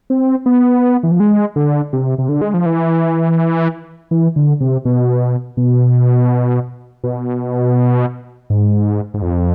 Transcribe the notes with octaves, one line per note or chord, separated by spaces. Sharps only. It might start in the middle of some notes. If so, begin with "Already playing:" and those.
C4
B3
E3
F3
G#3
D3
C3
C3
D3
G#3
F3
E3
E3
D3
C3
B2
B2
B2
G#2
G#2
F2